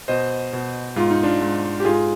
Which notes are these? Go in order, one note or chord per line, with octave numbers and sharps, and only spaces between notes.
B2 C5 D#5
B2
G#2 F4
D#4
D4 F4
G#2
G4
G#2 F4 G#4